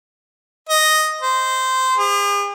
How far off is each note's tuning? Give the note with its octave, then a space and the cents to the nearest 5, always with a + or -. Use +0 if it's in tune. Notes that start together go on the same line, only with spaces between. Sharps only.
D#5 +0
C5 -15
G#4 -45